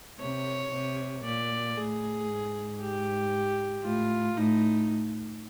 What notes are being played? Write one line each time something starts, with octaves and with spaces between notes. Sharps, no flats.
C3 C#5
C3
A#2 D5
A2 G#4
G#2
G4
A2 F4
A2 D#4